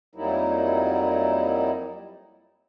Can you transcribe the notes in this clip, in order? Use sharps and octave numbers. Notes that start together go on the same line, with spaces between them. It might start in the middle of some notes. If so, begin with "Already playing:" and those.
F2 F#3 G3 A#3 D#4 E4